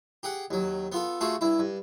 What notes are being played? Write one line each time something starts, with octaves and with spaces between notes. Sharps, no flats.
G4 G#4 F#5
D#2 F#3
B3 F4 A4
A3 F4 F#4 G#4 A4
G2 E4
G2